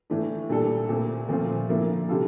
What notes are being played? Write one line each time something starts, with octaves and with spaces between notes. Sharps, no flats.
A2 E3 A3 D4
A#2 G3 D4 A4
A#2 A3 C4
A#2 F3 A3 C4 F4
D3 F3 A#3 E4
C3 G3 D4 F4 A4